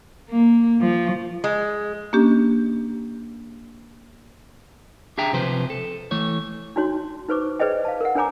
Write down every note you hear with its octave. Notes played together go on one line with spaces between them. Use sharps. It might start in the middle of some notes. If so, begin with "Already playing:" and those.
A#3
F3
G#3
A#3 C#4 D4 G4
D4 G4 G#4 E5 G5 A#5
C3 F3 B4 C5
A4
E3 A3 C#5
D4 D#4 F#4 C#5 C6
D#4 B4 C5 C#6 D6
G#4 B4 C5 D5 D#5 G5
F5 A5
A#4 F#5
D4 A#4 C#5 G#5 A#5 D6